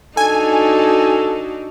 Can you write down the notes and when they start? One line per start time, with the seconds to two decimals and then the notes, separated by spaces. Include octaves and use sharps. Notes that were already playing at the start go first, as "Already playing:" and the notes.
0.17 D4 D#4 F#4 A4 G#5